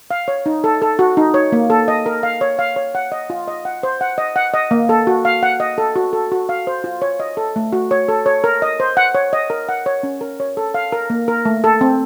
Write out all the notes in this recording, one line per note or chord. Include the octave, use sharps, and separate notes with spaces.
F5
C#5
D#4
A4
A4
F#4
D#4
C#5
A#3
A4
D#5
A#4
F5
C#5
F5
C#5
F#5
D#5
F4
D#5
F#5
C5
F#5
D#5
F#5
D#5
A#3
A4
F#4
F5
F#5
D#5
A4
F#4
A4
F#4
F5
C5
F4
C#5
D#5
A4
A3
F#4
C#5
A4
C#5
A#4
D#5
C5
F#5
C#5
D#5
A#4
F#5
C#5
C#4
A#4
C#5
A4
F5
A#4
A#3
A#4
A3
A4
C4